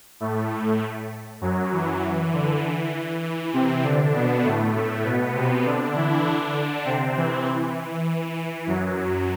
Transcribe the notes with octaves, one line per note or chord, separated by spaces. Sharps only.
A2 A3
F#2 F#3
E3
E3
D3
E3
E3
C3 C4
D3 D4
B2 B3
A2 A3
A2 A3
B2 B3
C3 C4
D3 D4
E3 E4
D3 D4
C3 C4
E3
E3
F#2 F#3